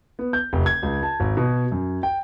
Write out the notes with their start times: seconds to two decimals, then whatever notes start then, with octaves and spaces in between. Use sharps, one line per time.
0.19 B3
0.33 G6
0.53 F1
0.66 G#6
0.83 C#2
1.03 A5
1.20 G#1
1.37 B2
1.72 F#2
2.03 G5